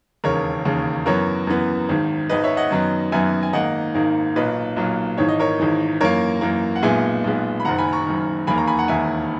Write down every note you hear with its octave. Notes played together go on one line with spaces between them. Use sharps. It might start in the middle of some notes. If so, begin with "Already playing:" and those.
E1 D#2 C#3 A#4 C#5
E1 D#2 C#3
F#2 E3 B3 A#4 C#5
F#2 E3 B3
G#1 G#2 D#3
G#1 G#2 D#3 B4 D#5
C#5 E5
D#5 F#5
F#2 D#3 F#3 B3
F#2 D#3 F#3 B3 E5 G#5
G#5
G#1 G#2 D#3 A#3 D#5 F#5
G#1 G#2 D#3 A#3
B1 A#2 F#3 B4 D#5
B1 A#2 F#3
G#1 G#2 E3 C#5
D#5
A#4 C#5
G#1 G#2 E3
F#2 E3 A#3 A#4 C#5
F#2 E3 A#3
F#5
B1 A#2 G#3 B3 E5 G#5
B1 A#2 G#3 B3
B5
F#1 F#2 D#3 F#5 A#5
G#5 B5
A#5 C#6
F#1 F#2 D#3
E1 D#2 D#3 A#3 G#5 B5
A#5 C#6
G#5 B5
F#5 A#5
E1 D#2 D#3 A#3 E5 G#5